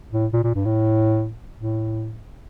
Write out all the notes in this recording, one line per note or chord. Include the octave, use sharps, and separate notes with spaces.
A2
A#2
A#2
G2
A2
A2